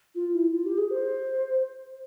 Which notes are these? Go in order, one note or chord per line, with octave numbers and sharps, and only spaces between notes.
F4
E4
F4
G4
G#4
C5